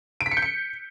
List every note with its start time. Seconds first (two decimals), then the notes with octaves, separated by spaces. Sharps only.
0.21 D7
0.26 B6
0.31 C#7
0.37 G6
0.42 C#7